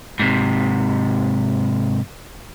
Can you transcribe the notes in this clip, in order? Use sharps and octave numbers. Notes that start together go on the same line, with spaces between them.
G#2 C3